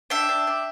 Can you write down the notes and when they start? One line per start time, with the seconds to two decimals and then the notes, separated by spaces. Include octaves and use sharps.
0.10 D4 E5 G5
0.29 D4
0.47 D4